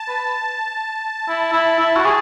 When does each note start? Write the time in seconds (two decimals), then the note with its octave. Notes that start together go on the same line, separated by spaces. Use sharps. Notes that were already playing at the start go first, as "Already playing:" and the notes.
Already playing: A5
0.08 B4
1.29 E4
1.53 E4
1.79 E4
1.97 F#4
2.06 G#4